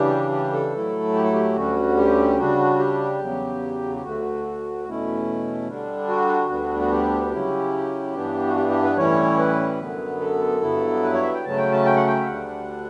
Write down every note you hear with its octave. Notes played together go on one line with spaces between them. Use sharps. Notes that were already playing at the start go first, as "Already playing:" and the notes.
Already playing: C#3 E3 G3 D4 G4
G4
A4
A2 F#3 A3 E4
G4
A4
G4
D2 D3 G3 C#4 F#4
G4
C#3 G3 D4 F#4
G4
E2 C#3 F#3
G4
D2 D3 A3 F#4
E2 B2 A3 C#4 E4
D3 G3 D4
F#4
D2 D3 G3 B3 D4
F#4
G4
C#3 F#3 C#4 E4
G2 E3 B3 D4
F#4
G4
G4
B4
A2 E3 G3 C#4 E4 C#5
B4
F#2 D3 F#3 B3
A4
G2 F#3 B3 E4
B4
C#5
E5
G5
C#3 F#3 A3 C#4 A5
G5
A5
G5
F#5
G5
E5
D2 D3 G3 D4 F#5